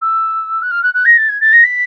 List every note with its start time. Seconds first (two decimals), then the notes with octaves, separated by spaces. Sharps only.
0.02 E6
0.62 F#6
0.71 F6
0.83 F#6
0.94 F#6
1.05 A#6
1.18 A6
1.29 G#6
1.41 A6
1.53 A#6
1.64 B6